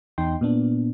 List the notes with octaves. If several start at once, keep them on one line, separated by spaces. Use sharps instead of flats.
E2 D#4 G5 C6
A#2 B3 D4